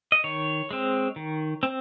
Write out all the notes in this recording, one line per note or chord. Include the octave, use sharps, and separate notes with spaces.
D#5
D#3 C#5
G#3 C4
D#3
C4